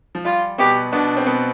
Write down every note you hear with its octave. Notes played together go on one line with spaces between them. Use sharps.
F3
G3 F4
B2 B3 G4
B2 B3 D4
C4
B2 B3